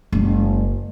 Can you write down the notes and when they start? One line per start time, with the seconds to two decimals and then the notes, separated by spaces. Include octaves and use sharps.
0.12 F#1 G#3